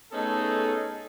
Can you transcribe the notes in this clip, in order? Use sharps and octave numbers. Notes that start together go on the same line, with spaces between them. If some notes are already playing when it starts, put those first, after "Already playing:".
A3 B3 C#4 D#4 G#4 A4